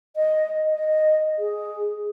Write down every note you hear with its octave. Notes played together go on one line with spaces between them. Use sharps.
D#5
D#5
G#4